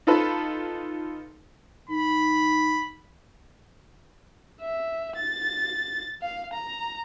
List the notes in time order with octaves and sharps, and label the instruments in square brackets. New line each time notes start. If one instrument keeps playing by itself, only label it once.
[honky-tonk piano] D#4 F4 A4 B4
[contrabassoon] D#3 [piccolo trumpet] B5
[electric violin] E5
A6
F5
A#5